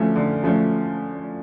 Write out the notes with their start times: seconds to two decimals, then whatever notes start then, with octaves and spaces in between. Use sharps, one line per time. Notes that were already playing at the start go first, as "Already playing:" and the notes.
Already playing: D3 F3 A3 C#4
0.16 D3
0.44 F3 A3 C#4